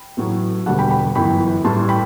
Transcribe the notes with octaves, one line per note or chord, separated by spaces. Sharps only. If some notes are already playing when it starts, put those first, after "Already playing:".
Already playing: G5 B5
A1 A2 F#3
E1 D2 D3 G3 F#5 A5
G5 B5
G5 B5
G1 F#2 E3 G5 B5
A1 A2 G3 A5 C6
G5 B5